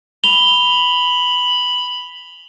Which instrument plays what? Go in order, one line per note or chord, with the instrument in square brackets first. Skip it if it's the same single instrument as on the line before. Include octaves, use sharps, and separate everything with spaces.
[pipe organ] B5 [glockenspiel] F7 G7